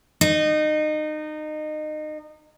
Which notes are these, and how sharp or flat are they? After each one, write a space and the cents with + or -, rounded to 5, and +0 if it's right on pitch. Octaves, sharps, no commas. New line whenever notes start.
D#4 -25